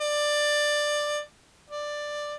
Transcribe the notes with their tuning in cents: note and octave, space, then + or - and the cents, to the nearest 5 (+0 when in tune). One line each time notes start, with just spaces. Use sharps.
D5 +15
D5 +10